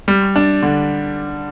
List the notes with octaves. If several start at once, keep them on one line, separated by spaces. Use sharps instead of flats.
G3
D4
D3